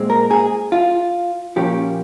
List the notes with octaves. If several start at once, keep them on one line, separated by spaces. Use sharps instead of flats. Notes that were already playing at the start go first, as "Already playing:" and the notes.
Already playing: A#2 G#3 C4
A#4
G#4
F4
A#2 F3 A#3 C#4 G4